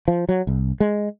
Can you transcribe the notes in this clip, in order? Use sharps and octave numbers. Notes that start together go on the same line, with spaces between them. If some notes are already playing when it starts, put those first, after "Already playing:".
F3
F#3
C2
G#3